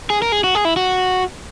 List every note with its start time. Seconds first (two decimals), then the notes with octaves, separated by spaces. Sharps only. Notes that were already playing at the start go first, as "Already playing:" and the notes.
0.10 G#4
0.22 A#4
0.32 G#4
0.44 F#4
0.55 G#4
0.65 E4
0.76 F#4